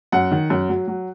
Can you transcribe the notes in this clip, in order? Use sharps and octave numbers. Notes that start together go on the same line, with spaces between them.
F#2 F#5
D#3
F#2
F#3
F#3